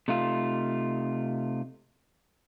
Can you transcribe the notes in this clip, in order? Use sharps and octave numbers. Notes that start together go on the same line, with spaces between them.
C3 A3 D#4 F4